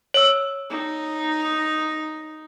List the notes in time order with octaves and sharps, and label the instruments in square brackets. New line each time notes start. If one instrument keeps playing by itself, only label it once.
[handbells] C#5 E6
[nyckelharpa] D#4